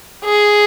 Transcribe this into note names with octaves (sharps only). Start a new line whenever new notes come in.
G#4